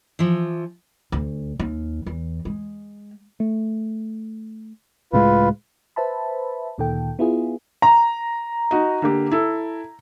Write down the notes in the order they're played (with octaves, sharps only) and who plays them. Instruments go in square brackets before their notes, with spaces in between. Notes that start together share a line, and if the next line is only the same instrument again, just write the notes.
[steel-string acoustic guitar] E3 F3
[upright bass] D2
D#2
E2
G#3
[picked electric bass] A3
[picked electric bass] C#2 A2 G#3 [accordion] F4 B4
[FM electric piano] B4 C5 E5 A5 B5
D2 A#2 D#3 A#3 A4 G5
B3 E4 F4 G#4
[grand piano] A#5
[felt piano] D#4 F#4 D#5
D3 A#3 G4
E4 A4